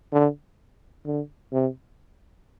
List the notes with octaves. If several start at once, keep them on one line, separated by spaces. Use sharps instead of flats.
D3
D3
C3